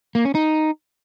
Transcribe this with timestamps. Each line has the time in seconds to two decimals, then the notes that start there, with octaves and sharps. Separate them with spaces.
0.15 A#3
0.25 C#4
0.35 D#4